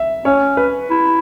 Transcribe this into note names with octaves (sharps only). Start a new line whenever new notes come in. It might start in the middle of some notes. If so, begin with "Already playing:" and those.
Already playing: E5
C#4 C#5
B4
E4